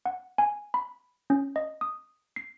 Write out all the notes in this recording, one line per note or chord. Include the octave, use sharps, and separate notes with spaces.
F#5
G#5
B5
C#4
D#5
D#6
C7